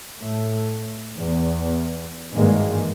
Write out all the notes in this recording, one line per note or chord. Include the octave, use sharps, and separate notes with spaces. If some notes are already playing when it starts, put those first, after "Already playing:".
A2 A3
E2
G#1 G2 D#3 E3 G#3 A#3